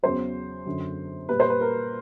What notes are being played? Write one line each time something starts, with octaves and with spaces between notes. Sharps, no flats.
E2 C#3 F#3 C5
F#2 D3 F#3
A#2 G3 B4
C5
B4
A#4